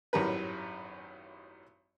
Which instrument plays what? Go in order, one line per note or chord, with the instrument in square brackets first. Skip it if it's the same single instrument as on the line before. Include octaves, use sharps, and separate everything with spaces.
[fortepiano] G#1 F#2 A2 G3 A#4 B4